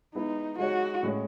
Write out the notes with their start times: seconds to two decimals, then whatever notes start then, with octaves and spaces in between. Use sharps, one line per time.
0.15 G#3 B3 D#4 E4
0.59 G#3 D#4 F#4 G#4 C#5
1.03 A2 G#3 C#4